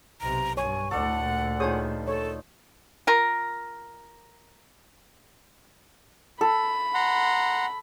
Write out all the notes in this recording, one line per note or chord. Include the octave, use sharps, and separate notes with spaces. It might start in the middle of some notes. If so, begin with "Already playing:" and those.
B1 C3 A#5
G2 C#5 G#5 C#6
D2 A#2 A4 D5 F#5
D#3 F3 G#4 C5 C#5 D#6
A4 C#5
F4 A#4
A4 B5
F#5 A#5 C6